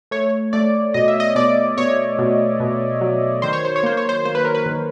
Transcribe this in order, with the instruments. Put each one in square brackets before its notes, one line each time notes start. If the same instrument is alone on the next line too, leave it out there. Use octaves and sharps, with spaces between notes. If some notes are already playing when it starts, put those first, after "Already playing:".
[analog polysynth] A3 C#5
A3 D5
B2 D#5
E5
D#5
B2 D5
B2 C#5
B2
B2
F#3
D#3 C5
C#5
C5
C#5
A#3 C5
C#5
C5
A#3 C5
B4
A#4
B4
D#3